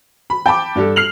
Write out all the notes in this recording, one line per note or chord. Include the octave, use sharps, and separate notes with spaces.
B5
G5 A5 B5 D6
G2 D4 G4 A4
F6 C7 F7 F#7